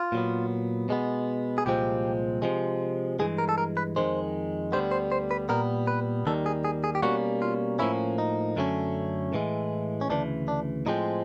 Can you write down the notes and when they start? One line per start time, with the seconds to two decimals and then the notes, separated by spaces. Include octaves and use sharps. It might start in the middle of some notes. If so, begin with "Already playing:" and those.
Already playing: F4
0.12 A#2 F#3 B3
0.89 B2 G#3 B3
1.58 G#4
1.66 C2 A#2 F3 G#3 C4 G4
2.42 C3 F3 G#3
3.19 G2 E3 G#3 G#4
3.38 A#4
3.49 A4
3.58 A#4
3.77 B4
3.96 F2 C3 D#3 G#3 C5
4.72 D2 D3 G3 B3 C5
4.91 C5
5.12 C5
5.31 B4
5.49 A#2 G3 B3 A#4
5.87 B4
6.26 D#2 D#3 G3 A4
6.46 G#4
6.65 G#4
6.84 G#4
6.95 G4
7.02 B2 G3 A#3 C#4 F#4
7.42 F4
7.79 A2 F3 A#3 C#4 E4
8.18 D#4
8.56 F#2 D3 F#3 A3 C#4
9.33 A2 E3 G#3
10.01 C#4
10.10 D2 C#3 E3 D4
10.48 D4
10.86 A2 F3 G#3 C4 D#4